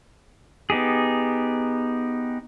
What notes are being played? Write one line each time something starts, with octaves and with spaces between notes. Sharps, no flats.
B3 D#4 G4 G#4